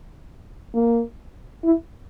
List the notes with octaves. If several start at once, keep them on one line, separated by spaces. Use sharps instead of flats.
A#3
E4